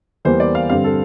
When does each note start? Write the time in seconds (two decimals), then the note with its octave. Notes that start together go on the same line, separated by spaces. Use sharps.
0.25 E2 E3 G3 A#3 C5
0.40 D5
0.55 F5
0.69 G2 D3 G3 C4 F5
0.84 A4